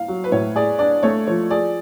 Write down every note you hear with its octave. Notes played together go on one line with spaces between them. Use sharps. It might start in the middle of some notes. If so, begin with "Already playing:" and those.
Already playing: F5
F#3
B4
A2 C#5
G#4 D5
D4 D5
A3 C#5
F3 C#5
G#4 D5